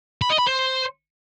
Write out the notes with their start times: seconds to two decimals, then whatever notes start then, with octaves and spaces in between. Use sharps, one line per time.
0.21 B5
0.30 D#5
0.39 B5
0.47 C5